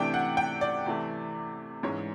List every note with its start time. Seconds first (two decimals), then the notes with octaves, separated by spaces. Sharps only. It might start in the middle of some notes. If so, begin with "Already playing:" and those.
Already playing: C3 E3 A3 D4 G5
0.14 F#5
0.37 G5
0.61 D5
0.86 C3 E3 A3
1.83 G#2 E3 G#3 C#4 C#5